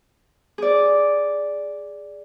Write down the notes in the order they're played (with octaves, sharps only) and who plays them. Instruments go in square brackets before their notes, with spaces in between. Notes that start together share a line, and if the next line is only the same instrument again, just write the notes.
[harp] G#4 D5